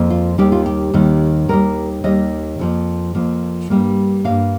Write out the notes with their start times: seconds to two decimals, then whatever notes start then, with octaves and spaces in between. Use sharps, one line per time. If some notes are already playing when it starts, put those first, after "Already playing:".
Already playing: F2 F3 A#3
0.10 F4
0.38 D#2 D#3 G3 G4
0.52 F4
0.66 G4
0.94 D#2 D#3 G3
1.49 D#2 D#3 G3 A#4
2.04 D#2 D#3 G3 D#5
2.59 F2 F3 A#3
3.15 F2 F3 A#3
3.70 G2 G3 A#3
4.24 G2 G3 A#3 F5